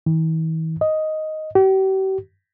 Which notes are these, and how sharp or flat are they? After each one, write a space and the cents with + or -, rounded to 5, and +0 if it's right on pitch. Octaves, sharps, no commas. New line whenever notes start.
E3 -45
D#5 +5
G4 -40